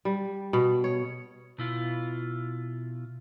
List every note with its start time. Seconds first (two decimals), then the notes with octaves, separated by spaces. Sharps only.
0.05 G3
0.53 B2
0.84 C#5
1.58 B2 E4 F4